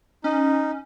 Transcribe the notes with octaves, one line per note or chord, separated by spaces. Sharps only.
C#4 D#4